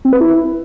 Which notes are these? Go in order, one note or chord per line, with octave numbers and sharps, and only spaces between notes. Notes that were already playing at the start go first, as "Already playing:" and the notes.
C4
B4
E4